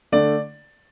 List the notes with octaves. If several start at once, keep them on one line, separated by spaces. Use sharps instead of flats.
D3 A3 D5